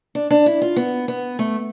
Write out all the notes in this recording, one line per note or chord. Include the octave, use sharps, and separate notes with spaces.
D4
D4
E4
F4
B3
B3
A3